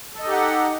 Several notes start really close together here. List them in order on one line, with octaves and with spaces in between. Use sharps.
A4 D#5 D#4 G4 F#5